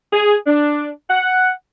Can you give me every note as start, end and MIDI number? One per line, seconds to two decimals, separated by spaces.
0.13 0.35 68
0.46 0.89 62
1.10 1.50 78